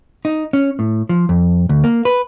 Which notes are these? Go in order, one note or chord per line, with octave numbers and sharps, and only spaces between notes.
D#4
C#4
A2
F3
F2
D2
A#3
B4